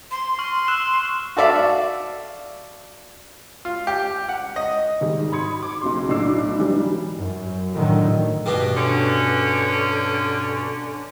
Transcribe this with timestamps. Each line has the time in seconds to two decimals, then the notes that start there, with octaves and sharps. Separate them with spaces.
0.11 C6
0.39 C#6 F6 F#7
0.68 E6 F#6 E7
1.37 F#4 A4 D5 E5 F5
3.65 F4
3.87 G4
4.29 F#5
4.56 D#5
5.01 G#2 D#3 G3
5.32 B5 C6 D#6 G#6 C#7
5.62 D6
5.81 B1 C#3 C6
6.09 B1 A2 D4 D6 E6 C7
6.58 D3 E3 F#3 G3
7.16 F#2
7.74 A2 D3 D#3 F#3
8.46 G2 B2
8.76 D3 C#4